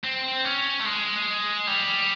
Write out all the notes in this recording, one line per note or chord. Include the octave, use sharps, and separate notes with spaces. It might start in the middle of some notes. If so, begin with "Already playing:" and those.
C4
C#4
A3
G#3
G3